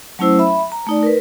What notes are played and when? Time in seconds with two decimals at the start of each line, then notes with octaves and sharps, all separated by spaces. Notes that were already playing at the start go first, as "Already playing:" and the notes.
0.19 F#3 A3 C#4 E4 C5 E6
0.39 E5 B5
0.72 A#5
0.87 A3 D#4 D5
1.03 A#4 B4